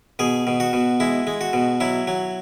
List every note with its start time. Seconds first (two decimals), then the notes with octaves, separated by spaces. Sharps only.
0.19 B2 G#4
0.47 B2
0.60 F#4
0.73 B2
1.00 G#3 E4
1.27 G#3
1.41 F#4
1.53 B2
1.80 F#3 E4
2.07 F#3